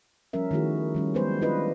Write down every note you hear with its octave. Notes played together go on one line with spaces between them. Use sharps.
F3 G3 C#4 A#4 E5
D#3 A3 E4 F#4 G#4
D#3 G3 C#4
F#3 G#3 B3 G4 B4 C5
D4 E4 F4 G4 B4 D#5